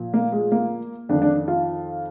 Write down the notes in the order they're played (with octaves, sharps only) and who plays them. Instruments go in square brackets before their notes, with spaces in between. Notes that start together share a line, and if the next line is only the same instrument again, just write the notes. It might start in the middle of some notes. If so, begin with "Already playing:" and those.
Already playing: [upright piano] A#2 F3
A#3
G#3
A#3
F2 D4
D#3
D4
F4